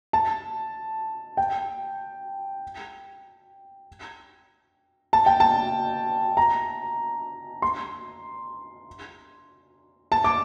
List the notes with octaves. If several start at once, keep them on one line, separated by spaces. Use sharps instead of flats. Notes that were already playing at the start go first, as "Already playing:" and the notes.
A5
G5
A5
G5
A5
A#5
C6
A5
D6